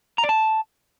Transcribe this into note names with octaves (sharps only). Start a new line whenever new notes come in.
A#5
D5
A5